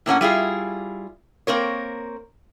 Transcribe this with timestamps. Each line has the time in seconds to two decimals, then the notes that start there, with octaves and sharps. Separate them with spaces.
0.06 A2 A#3 C#4 F#5
0.21 G3 E4 F4 G#4
1.47 A#3 C4 A#4 C#5